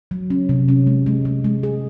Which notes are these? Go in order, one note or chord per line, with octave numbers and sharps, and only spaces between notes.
F#3
C#4
C3
C#4
G#3
G#3
G#3
G#3
G#4